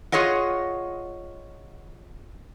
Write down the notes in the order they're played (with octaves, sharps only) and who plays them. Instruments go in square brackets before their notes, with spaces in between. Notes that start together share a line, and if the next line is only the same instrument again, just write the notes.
[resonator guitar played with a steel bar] F4 G#4 C#5 D#5 F#5